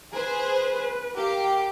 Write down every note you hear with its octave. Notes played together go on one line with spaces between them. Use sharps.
G#4 B4 C5
G4 A#4 F5